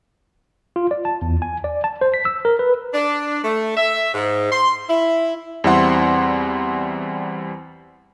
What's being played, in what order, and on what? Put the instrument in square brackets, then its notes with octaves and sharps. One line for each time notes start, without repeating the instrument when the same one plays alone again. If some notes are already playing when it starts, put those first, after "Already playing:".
[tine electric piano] F4
D5
A5
E2
G#5
D5
A5
C5
B6
E6
A#4
B4
[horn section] D4
A3
E5
G#2
C6
E4
[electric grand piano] E2 G3 C4 E4 F#5 C6